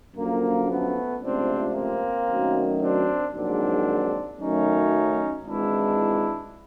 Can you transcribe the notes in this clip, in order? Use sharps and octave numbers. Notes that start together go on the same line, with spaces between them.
F#2 D3 F3 A#3
A3 B3
C#2 C3 F3 A3 C4 D4
A#3 C4
F#2 D#3 F#3 A3
C4 D4
A#1 G#2 D#3 F#3 C4 D4
F#2 D#3 F#3 A3 C#4 D#4
G#1 G#2 E3 G#3 D4 E4